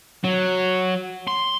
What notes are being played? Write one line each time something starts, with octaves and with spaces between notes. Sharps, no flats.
F#3
C6